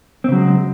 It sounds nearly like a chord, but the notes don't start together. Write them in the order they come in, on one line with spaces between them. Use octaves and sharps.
C4 C#3 F#3 G#3